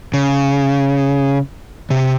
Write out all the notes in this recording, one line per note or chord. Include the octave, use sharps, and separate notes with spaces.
C#3
C3